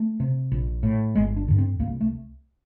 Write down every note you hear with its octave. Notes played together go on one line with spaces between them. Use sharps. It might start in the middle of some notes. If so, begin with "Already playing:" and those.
Already playing: A3
C3
A#1
A2
G1 G#3
D4
G2 D3
C4
C2 A#3
A3